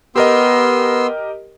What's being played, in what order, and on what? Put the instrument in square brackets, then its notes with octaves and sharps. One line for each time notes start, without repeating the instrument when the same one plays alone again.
[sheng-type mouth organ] B3 C6 E6 [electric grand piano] G4 A#4 D#5